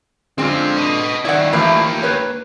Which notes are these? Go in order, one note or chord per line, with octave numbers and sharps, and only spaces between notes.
D3 G#3 C4 F4
B4 D#5
D#3 E4 D5 F#5
E3 F3 A3 A#3 G4
B4 C#5